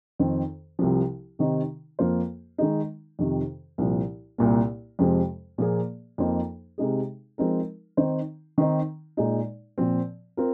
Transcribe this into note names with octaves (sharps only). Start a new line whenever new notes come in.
F2 D#3 C4
C2 C3 F3
C3 D#3 C4 D#4
F2 F3 A#3 F4 C5
D#3 G#3 D#4
F2 C3 D#3
C2 A#2 F3
C2 A#2 A#3
F2 C3 F3 G#3 C4
A#2 F3 A#3 G#4
F2 F3 A#3 D#4 C5
C3 G#3 D#4 G#4
F3 G#3 C4 D#4 A#4
D#3 C4 D#4 C5
D#3 C4 D#4
A#2 G#3 D#4
A#2 F3 C4
C4 F4 A#4